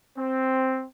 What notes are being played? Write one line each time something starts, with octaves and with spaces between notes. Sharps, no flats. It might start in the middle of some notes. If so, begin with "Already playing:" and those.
C4